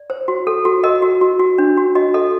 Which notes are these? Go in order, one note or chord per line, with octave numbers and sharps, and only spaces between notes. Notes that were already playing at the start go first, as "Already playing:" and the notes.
Already playing: D5
C5
F#4
A4
F#4
A#4 D#5
F#4
F#4
F#4
D4
F#4
F#4 D#5
A4 D#5